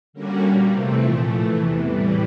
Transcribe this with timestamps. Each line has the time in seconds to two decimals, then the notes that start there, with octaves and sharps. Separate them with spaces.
0.13 D3 G3 A#3 C#4 F#4
0.41 A#2 G3 A#3
0.69 E2 C3 E3 A3 C4
0.98 A#2 F3 A3
1.26 A2 E3 A3
1.55 E2 C3 E3
1.83 A2 E3 G3